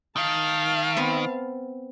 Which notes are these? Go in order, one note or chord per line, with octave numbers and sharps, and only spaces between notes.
D#3 F5 A5
B3 C4